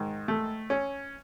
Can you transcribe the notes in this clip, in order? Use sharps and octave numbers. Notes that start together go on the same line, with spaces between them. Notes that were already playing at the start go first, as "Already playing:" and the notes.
Already playing: G#2 D#3
A3
C#4